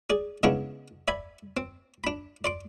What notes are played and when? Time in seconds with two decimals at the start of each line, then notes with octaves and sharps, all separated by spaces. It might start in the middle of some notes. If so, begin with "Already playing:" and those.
0.10 G#4 D5
0.43 C#3 G#3 B3 C#4 D4 E4
1.08 D5 E5 G#5 B5
1.57 C4
2.04 D4 B5
2.44 D5 C6 D6